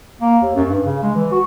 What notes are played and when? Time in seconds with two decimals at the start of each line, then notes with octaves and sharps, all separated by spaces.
0.21 A#3
0.42 D#2
0.55 F#2
0.70 G2
0.85 C#3
1.03 G#3
1.15 E3
1.32 F#4